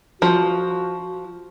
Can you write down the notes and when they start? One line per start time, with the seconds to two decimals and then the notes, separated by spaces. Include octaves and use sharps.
0.22 F3 F#4